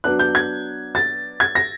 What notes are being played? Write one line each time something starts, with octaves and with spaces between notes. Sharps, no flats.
F#3 B3 D4 F#6
G6
G#6
A6
G#6
A#6